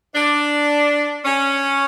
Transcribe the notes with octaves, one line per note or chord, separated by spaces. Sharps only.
D4
C#4